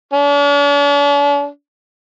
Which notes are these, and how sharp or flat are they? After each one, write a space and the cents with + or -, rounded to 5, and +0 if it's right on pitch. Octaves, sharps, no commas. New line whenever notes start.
D4 -45